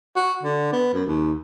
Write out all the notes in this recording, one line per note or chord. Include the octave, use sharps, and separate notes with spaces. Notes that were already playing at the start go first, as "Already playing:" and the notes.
F#4
D3
B3
F#2
D#2